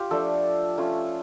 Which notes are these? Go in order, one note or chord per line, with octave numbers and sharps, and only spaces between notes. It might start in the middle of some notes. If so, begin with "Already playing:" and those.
Already playing: F4 G4
F3 A3 D4 A4
A3 C#4 F4